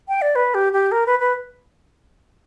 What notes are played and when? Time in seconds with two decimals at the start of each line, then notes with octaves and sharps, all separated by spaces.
0.08 G5
0.22 D5
0.36 B4
0.54 G4
0.73 G4
0.92 A#4
1.06 B4
1.20 B4